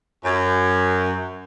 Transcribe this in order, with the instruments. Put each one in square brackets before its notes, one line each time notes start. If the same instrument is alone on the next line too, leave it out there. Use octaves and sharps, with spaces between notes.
[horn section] F#2